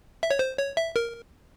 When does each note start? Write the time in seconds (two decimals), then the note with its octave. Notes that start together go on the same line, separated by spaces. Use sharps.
0.23 E5
0.31 C#5
0.39 C5
0.58 C#5
0.77 E5
0.96 A#4